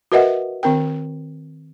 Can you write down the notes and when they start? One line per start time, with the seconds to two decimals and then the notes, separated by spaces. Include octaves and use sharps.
0.12 F#4 A#4 B4 D#5 E5 F#5
0.63 D#3 C4 A#4 G5